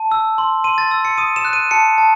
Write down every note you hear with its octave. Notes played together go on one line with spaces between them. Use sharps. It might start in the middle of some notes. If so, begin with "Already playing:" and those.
Already playing: A5
E6
C6
C6 D#7
A6
E6
C#7
D#6 D#7
E7
F#6
D#7
A5 C#7
A5